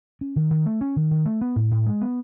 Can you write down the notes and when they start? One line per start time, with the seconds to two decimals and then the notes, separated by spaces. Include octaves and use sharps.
0.21 C#4
0.36 D#3
0.51 D#3
0.66 A3
0.81 C#4
0.96 D#3
1.11 D#3
1.26 A3
1.41 B3
1.56 A2
1.71 A2
1.86 G#3
2.01 B3